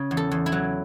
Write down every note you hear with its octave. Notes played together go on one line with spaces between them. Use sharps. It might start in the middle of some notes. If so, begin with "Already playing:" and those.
Already playing: C#3
E2
A4
E2
E4
F#3